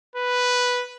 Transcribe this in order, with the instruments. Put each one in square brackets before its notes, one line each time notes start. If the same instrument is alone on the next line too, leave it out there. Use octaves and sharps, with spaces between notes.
[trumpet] B4